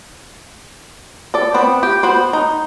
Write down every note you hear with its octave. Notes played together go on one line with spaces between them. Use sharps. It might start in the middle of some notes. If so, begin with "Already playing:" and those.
A4 D5
B3 C4
G4
B3 F#4 C5
D#4